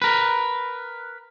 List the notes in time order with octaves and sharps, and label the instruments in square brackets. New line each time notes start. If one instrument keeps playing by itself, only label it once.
[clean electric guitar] A#4 B4